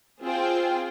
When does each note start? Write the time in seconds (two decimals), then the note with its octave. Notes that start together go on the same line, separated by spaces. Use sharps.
0.23 C4 F4 G#4 C5 G5